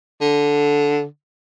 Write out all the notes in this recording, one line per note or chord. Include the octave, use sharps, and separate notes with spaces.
D3